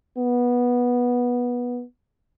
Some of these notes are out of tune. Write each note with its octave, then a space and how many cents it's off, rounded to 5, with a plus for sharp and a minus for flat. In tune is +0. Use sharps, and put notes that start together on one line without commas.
B3 -15